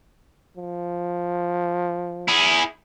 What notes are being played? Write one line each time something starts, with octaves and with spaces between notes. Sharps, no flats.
F3
E4 G#4